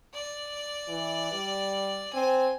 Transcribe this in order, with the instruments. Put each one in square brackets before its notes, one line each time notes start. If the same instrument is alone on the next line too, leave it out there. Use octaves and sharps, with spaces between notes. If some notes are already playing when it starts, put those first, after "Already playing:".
[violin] D5
[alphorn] E3
G3
[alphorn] C4 [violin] G#5